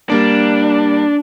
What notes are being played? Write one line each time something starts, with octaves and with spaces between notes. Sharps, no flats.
G3 A#3 D4 D5